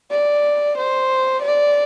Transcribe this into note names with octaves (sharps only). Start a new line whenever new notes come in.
D5
C5
D5